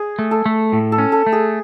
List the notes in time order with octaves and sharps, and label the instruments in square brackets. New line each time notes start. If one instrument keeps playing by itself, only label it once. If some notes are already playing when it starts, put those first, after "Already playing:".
Already playing: [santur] G#4
[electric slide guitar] A3
[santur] A4
[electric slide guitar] A3
A2
[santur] A4
[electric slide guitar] C#4
[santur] A4
[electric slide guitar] A3
[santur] G#4